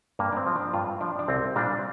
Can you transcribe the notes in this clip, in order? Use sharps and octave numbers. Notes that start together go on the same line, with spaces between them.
G2 A#3
D4
C4
F3
D4
G2 F4
F3 D4
D4
C2 C4
A#2 G3 D4